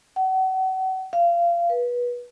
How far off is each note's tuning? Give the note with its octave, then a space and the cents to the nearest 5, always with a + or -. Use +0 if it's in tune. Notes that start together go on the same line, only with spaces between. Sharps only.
F#5 +35
F5 -25
B4 -25